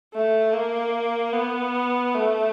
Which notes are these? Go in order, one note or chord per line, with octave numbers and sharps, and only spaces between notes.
A3
A#3
B3
A3